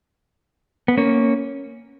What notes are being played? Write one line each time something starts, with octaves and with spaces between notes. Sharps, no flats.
B3
A#3 C#4